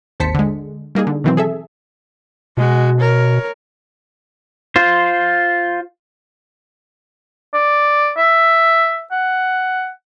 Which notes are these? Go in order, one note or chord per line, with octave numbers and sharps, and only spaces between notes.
G#1 D#2 C5 A5 B6 C#7
D3 G#3
G3 A#3 D#4 G#4
D3
B2 D#3 E3 F#3 C4
G#4 A4 E5
B2 G#3 F#4
A#4 C#5
F4 C5
D5
E5
F#5